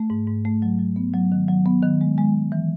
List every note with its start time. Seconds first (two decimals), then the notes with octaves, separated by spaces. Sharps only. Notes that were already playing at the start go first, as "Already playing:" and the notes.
Already playing: A3
0.10 G#2
0.27 G#2
0.45 A3
0.62 F#3
0.79 F#3
0.96 B3
1.14 F#3
1.32 D#3
1.48 F#3
1.66 B3
1.83 D#3
2.01 G#3
2.18 G#3
2.34 G#3
2.52 E3